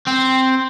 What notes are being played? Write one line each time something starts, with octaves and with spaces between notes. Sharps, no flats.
C4